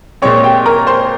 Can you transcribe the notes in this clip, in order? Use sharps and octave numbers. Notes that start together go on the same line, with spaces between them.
A#2 G#3 C4 C#5 C#6
G4 G5
A#4 A#5
C5 C6